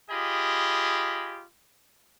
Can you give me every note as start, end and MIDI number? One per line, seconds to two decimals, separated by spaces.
0.10 1.44 65
0.10 1.44 67
0.10 1.44 68
0.10 1.44 75
0.10 1.44 83